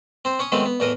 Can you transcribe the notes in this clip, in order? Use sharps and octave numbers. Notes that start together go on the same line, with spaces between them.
C4 C5
C#4 C#5 C#6 D#6
D#3 F#3 G#3 A3 B3 C4
B3
E2 A2 E3 A#4 D#5 D#6